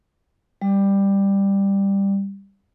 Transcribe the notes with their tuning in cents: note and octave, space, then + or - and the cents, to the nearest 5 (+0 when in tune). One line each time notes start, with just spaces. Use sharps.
G3 +10